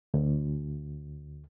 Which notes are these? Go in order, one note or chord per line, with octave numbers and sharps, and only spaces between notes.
D2